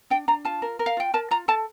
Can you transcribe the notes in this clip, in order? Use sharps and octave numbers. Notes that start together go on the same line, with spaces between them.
D4 G5
D4 A#5
F4 A5
A#4
A#4
F5
F4 G5
A#4 A5
F4 A#5
A4 A5